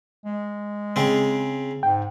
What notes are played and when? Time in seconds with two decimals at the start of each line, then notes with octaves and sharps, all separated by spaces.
0.25 G#3
0.96 C#3 C4
1.83 G#2 G5